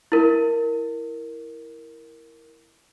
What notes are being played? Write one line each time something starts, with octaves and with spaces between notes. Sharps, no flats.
E4 A#4